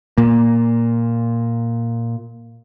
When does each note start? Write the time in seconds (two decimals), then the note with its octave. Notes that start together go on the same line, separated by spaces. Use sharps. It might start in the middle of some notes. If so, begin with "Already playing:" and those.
0.18 A#2 A#3